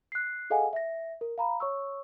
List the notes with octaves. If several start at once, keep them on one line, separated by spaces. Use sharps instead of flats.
F#6 C7
G#4 A4 D#5 F5 F#5 G#5
E5 A#6
A#4
F5 A#5 B5
C#5 C#6 E6